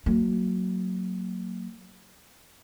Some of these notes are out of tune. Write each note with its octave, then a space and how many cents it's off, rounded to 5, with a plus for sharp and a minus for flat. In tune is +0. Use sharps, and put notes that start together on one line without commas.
F#3 +0 A#3 -25